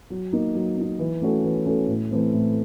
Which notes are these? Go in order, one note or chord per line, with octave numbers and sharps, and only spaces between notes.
F#3
A#3 D#4
F#3
A#3 D#4
E3
A3 C#4 F#4 A4
E3
A3 C#4 F#4 A4
A2
E3 A3 C4
A2